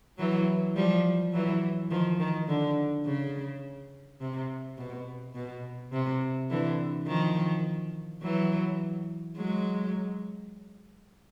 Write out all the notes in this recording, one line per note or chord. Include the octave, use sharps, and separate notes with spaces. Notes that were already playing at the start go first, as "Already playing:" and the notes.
E3 F#3
F3 G3
E3 F#3
D#3 F3
D#3
D3
C#3
C3
B2
B2
C3
D3 E3
D#3 F3
E3 F#3
F#3 G#3